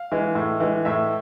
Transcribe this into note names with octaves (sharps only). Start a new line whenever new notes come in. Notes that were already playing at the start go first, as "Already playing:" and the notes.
Already playing: F5
E3 G#3
A2
E3 G#3
A2 E5